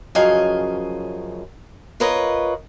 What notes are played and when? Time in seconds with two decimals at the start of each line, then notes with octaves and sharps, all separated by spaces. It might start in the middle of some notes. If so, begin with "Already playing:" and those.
0.15 F#2 C#3 F3 D#5 F5 G#5
2.00 F4 A#4 B4 C#5 D#5